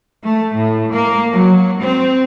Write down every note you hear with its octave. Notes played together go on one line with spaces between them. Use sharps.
A3
A2
A#3
F#3
C4